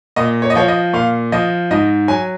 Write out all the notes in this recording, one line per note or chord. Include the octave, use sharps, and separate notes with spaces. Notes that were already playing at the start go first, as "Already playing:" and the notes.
A#2 D#5
C#5
D#5
F3 C#5
D#5
A#2 F5
F3 D#5
G#2 D#5
F#3 G#5